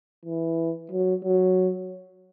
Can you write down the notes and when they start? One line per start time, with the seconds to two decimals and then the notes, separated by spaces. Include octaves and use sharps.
0.26 E3
0.91 F#3
1.24 F#3